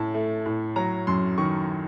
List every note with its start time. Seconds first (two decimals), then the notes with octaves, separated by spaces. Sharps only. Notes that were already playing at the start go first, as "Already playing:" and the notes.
Already playing: A2 C#4 A5
0.14 A3
0.46 A2
0.76 F#3 A#5
1.07 F#2 C6
1.38 D#3 C#6